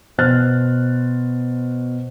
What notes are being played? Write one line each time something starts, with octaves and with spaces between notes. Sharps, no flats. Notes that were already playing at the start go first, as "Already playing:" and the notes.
B2 C5 F6 F#6 A6